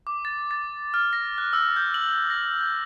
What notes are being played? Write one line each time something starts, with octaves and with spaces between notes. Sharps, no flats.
D6
A6
A6
F6
A#6
F#6
E6
G6
F#7
A#6
G6